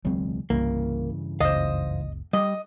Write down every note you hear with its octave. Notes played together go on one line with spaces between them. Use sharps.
E1 C#2 F#3 G#3 C4
C2 G2 C#3 E3 A#3
F#1 C#2 C5 D#5 F5
G3 D#5